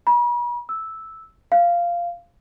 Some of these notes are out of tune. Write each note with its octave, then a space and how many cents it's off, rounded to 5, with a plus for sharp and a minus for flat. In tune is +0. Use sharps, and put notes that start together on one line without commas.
B5 -45
E6 -5
F5 -10